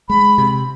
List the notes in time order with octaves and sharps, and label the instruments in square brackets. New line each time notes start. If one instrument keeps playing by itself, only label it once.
[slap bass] G#3 [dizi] B5
[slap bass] C3